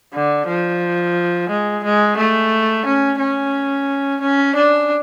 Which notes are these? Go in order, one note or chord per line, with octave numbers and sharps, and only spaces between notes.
D3
F3
G#3
G#3
A3
C#4
C#4
C#4
D4